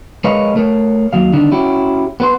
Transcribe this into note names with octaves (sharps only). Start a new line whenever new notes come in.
G#3 A#4 B4 C#5 D#5 F5
A3 A#4 C#5
D#2 F#3 F5
D3 D#3 G3 D4
C#4 E4 F#4 G4
B3 B4 C6